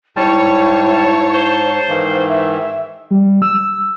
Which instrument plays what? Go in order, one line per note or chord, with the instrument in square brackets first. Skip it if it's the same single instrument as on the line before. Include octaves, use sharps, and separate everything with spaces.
[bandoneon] G#2 A5 [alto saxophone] G3 [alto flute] E4 [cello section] C#5
[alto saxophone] C5
[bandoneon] G#2 D#3 E3 [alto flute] F5
[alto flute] E5
[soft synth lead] G3
E6